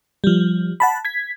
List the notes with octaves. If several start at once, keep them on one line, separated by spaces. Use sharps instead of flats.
F3 G3
F#5 A5 B5
G#6 B6